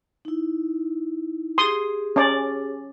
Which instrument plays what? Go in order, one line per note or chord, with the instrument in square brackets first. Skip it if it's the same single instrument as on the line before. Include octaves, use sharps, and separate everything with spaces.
[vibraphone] D#4 E4
[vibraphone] G4 G#4 [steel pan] C6 D#6
[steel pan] C#4 D5